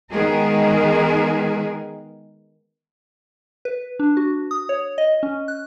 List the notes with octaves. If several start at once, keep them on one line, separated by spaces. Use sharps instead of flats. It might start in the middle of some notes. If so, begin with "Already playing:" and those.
D#3 G#3 B3 G#4 A#4
B4
D4
F#4
D#6
C#5
D#5
C#4
F#6